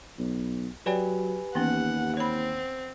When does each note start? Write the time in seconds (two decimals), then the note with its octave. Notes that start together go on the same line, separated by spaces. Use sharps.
0.19 B1
0.86 F#3 G4 B4 C#5 D5 G5 G#5
1.55 D#2 E3 B3 C#4 F#5
2.17 C4 C#5 B5